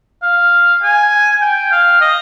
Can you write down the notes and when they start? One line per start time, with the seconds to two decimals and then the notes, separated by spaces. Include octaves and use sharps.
0.23 F5
0.83 G#5
1.42 G5
1.72 F5
2.01 D#5